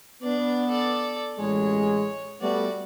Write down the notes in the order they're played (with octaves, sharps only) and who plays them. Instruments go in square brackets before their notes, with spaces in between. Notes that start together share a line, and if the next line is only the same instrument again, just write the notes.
[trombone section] B3 [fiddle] D4 D5
[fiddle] A4 D5
[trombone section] A1 G#3 [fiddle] C#5
[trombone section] G3 A3 B3 [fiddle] F#4 D5